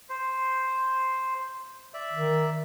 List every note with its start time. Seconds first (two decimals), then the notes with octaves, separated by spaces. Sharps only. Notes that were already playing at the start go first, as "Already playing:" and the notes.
0.09 C5
1.94 D5 E5
2.13 D#3